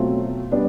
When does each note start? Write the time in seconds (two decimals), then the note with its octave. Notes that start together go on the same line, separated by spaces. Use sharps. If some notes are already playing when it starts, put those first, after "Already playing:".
Already playing: B2 F#3 A3 C4 F4
0.52 G3 B3 D4